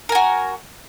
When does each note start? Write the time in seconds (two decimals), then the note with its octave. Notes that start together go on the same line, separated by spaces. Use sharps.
0.09 A#4
0.12 G#5
0.15 F#4